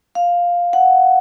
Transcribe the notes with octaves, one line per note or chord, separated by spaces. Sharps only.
F5
F#5